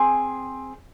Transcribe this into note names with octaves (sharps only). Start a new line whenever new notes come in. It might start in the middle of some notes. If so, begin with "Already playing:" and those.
Already playing: C4 G#4